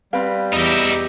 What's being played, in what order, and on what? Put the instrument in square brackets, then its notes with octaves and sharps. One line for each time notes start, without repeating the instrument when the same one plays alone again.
[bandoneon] G3 [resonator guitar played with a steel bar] C4 B4 F5
[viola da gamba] E2 G4 [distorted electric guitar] D#4 E4